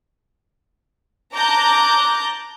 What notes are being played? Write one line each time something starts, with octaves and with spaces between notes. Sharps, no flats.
A5 A#5 D6 F#6 G6 A#6